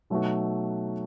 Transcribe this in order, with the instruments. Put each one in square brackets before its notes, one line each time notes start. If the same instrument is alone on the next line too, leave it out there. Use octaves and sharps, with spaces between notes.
[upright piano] B2 F#3 A3 D#4 F#4